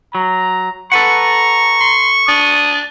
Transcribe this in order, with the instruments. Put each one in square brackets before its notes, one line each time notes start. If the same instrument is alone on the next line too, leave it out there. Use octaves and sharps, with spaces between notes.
[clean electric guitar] F#3 [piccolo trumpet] A#5
[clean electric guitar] A4 B4 F#5 [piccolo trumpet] A#5 [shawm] C#6
[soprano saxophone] C6
[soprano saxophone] D4 [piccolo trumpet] D#6